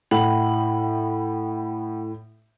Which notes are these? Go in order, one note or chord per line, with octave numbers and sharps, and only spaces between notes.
A2 F#5 G5 B5 F#7